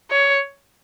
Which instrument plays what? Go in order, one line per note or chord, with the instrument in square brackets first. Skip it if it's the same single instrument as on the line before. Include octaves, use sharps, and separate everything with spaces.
[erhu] C#5